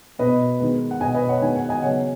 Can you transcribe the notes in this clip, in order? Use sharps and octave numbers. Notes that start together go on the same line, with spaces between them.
B2 B3 B4 D#5
D#3 G#3 B3
F#5
B2 B3 D#5 G#5
B4 D#5
C#5 F#5
D#3 G#3 B3 G#5
F#5
D#5 G#5
C#3 F#3 B3 C#5 F#5